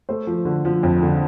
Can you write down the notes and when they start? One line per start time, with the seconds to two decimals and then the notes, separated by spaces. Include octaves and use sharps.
0.09 A3 C5
0.27 F3
0.45 D3
0.65 F3
0.83 F2
1.02 D3